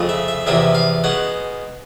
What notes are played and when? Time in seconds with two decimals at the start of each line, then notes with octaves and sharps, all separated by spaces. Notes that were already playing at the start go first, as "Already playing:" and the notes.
Already playing: F2 C#3 F3 G#3
0.09 E5
0.28 E5
0.46 E2 C3 F3 A#3 E5
0.75 F5
1.04 B2 G#3 C#4 F#5